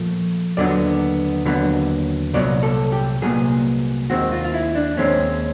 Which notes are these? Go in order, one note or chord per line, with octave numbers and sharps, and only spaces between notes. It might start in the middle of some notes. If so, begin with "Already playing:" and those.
Already playing: A#2 F3 A3
D#2 D3 F#3 B3 D5
D#2 D3 F#3 B3
C2 A#2 F#3 B3 D5
A4
G4
C2 A#2 F#3 B3 G#4
D#2 D#3 G#3 C4 F#4
F4
F4
E4
D4
D#2 D#3 G#3 C4 C#4